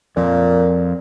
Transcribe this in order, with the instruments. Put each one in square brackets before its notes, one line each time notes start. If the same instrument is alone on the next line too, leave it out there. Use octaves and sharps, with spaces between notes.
[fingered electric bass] F2 [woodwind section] A#2